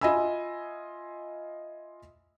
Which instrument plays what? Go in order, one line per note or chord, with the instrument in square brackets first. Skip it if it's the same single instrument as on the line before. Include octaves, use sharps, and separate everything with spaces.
[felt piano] F4 D#5 E5 G#5 B5 E6